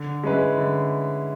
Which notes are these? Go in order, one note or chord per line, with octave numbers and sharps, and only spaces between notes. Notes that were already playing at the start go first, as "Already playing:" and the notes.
Already playing: D3
G#3 C#4 E4 B4
D3